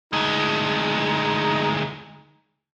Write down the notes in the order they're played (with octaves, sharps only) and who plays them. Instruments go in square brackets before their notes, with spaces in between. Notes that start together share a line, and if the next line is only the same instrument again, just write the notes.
[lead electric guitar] D2 G#3 [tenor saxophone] D#4